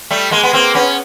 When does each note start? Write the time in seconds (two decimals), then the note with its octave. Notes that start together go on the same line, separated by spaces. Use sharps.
0.11 G3 A3
0.31 G#3 A#3
0.43 B3
0.53 A#3 C4
0.75 B3 C#4